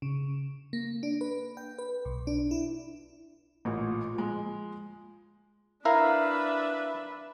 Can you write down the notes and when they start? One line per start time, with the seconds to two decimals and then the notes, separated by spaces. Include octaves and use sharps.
0.02 C#3
0.73 A#3
1.03 D4
1.21 B4
1.57 G5
1.79 B4
2.05 B1
2.27 D4
2.51 E4
3.65 A1 A#2
4.14 F3 G#3
5.85 D4 E4 A#4 B4 E5 F5